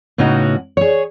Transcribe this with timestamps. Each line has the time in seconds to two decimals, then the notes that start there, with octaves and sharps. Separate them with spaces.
0.18 A2 C#3 B3 C#4 D#4 F#4
0.77 G#4 C#5